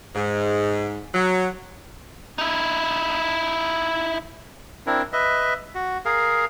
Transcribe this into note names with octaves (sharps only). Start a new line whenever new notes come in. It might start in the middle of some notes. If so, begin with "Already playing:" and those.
G#2
F#3
D#4 E4
C4 D4 E4 A#4
B4 D#5 E5
F#4
G#4 A#4 F5